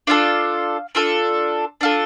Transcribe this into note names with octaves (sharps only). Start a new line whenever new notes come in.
D4 F4 A4 F5
D4 F4 A4
D4 F4 A4